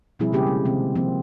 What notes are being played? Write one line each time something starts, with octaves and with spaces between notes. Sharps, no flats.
B2 F3 G3 C4 E4 G#4
C#3 G#3 A#3 C#4 G4 G#4
G#3
C3 D#3 C4
F3 A#3 C4